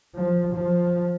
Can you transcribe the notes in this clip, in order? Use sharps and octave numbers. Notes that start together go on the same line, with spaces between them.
F3
F3